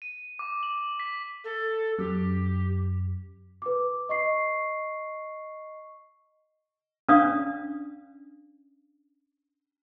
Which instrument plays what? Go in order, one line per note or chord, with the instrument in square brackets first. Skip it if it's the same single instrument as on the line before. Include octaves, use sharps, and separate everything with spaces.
[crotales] D#7
D6
F#7
B6
[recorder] A4
[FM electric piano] F#2 [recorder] G4
[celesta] B4 D6
D#5 C#6 C7
[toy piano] C#4 D4 D5 F5 D#6